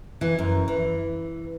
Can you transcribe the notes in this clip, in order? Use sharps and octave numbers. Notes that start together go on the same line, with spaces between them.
E3
F#2
E3